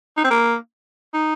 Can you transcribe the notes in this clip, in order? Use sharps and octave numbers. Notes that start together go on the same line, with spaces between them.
D#4
C4
A#3
D#4